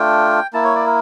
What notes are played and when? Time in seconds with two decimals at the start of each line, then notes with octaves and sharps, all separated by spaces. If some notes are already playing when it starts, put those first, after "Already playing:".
Already playing: A3 D4 F4 G5
0.53 A#3 E4 A5
0.64 C#5
0.75 D5
0.86 A#4